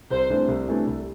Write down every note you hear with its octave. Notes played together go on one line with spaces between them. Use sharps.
C2 C5
C3 E3 A3 D4
C2
C3 E3 A3 D4
C2